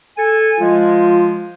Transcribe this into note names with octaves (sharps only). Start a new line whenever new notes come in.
A4 G#5
F3 G#3 F4